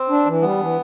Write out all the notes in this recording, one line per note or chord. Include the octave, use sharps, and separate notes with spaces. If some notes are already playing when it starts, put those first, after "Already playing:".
Already playing: C4
D4
E3
G3 B3
E3